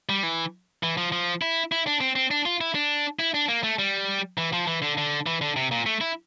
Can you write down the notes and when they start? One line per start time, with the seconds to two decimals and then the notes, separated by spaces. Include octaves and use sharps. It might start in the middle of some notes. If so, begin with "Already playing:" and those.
0.09 G3
0.23 E3
0.83 E3
0.97 F3
1.12 F3
1.42 E4
1.72 E4
1.87 D4
2.01 C4
2.16 C4
2.31 D4
2.45 F4
2.61 E4
2.75 D4
3.19 E4
3.34 D4
3.48 A#3
3.64 A3
3.79 G3
4.38 E3
4.53 F3
4.67 E3
4.82 D3
4.98 D3
5.26 E3
5.41 D3
5.56 C3
5.71 A#2
5.86 A3
6.01 E4